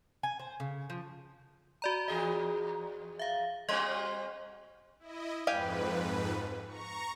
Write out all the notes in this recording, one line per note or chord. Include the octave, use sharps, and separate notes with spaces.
G#5
C5
C#3
F3
F#4 D5 A#5
E2 G#4 D#5
E5 F5
G3 C4 F#4 D#5 C6
E4 D#5
F2 G#2 G4 B4 F5 G#5
A#5 C#6